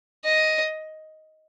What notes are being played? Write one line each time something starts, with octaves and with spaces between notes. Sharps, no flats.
D#5